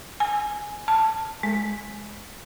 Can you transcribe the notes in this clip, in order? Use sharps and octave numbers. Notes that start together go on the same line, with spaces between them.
G#5
A5
G#3